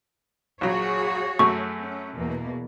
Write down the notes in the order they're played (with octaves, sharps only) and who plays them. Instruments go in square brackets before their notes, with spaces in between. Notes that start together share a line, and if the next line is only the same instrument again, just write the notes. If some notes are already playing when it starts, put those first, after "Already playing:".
[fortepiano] A#1 F#3 [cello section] F#4 G#4 C#5
[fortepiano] F#2 F#3 A3 [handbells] C#6
[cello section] C#4
E2 B2 A#3